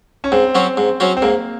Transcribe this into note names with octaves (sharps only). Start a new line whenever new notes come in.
C#4
G#2 C4
F#3 C#4 F#4 C5
G#2
F#3 C#4 F#4 C5
C4
G#2 A#3